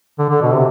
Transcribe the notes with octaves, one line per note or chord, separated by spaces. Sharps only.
D3
D3
B2
C3